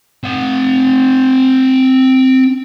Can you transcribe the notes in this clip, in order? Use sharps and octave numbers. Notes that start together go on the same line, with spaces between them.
C4 F#5